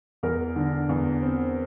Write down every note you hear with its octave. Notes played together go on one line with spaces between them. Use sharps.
E2 A#4
D3
E2
C4